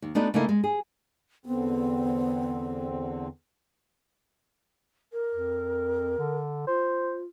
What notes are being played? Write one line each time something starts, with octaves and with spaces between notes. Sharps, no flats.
D#2
A3 B3 D4 D#4 F#4 B4
C#3 A3 A#3 D#4 E4
G#3
G#4
E2 D3 B3 C4
A#4
F2
D3
F4 C5